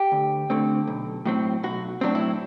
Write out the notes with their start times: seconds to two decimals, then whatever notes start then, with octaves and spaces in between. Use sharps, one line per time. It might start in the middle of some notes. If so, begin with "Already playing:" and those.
Already playing: G4
0.12 D2
0.50 D3 A3 C4
0.87 B1
1.25 A2 F#3 C4
1.63 B1 F#4
2.01 A2 F#3 C4 D4
2.15 E4